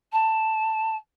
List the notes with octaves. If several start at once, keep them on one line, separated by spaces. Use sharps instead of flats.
A5